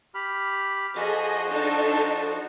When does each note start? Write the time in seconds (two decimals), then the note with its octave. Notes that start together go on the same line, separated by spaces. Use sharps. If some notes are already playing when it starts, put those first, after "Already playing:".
0.15 G4 B5 F6
0.96 F3 F#4 G#4 A4 D#5
1.51 D4 D#4 A4